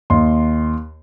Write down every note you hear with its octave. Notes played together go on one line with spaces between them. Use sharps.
D#2 D#5 C6